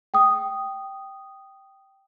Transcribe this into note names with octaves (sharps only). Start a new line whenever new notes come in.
G5 D#6